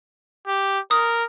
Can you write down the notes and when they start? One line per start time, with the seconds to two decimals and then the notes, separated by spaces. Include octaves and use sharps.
0.47 G4
0.91 A#4 D#6